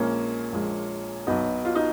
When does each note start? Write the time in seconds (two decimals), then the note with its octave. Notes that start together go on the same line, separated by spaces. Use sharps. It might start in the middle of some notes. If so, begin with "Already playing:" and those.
Already playing: A#1 A#2 G#3 A#3 C#4
0.52 A#1 A#2 G#3
1.27 B1 B2 F#3 B3 D#4
1.65 F4
1.75 D#4